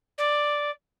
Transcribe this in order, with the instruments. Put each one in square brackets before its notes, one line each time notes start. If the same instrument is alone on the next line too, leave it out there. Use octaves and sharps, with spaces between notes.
[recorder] D5